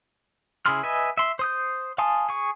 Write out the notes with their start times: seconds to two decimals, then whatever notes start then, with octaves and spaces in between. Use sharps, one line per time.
0.66 C#3 E4 G#4 C6 F6
0.83 B4 D#5 E5 G#5
1.18 E5 C6
1.39 C5 D#6 G6
1.98 F5 G#5 A5 C6 D#6
2.29 G#4 C#6